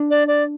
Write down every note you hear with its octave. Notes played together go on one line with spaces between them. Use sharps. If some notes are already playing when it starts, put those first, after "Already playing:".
Already playing: D4
D5
D5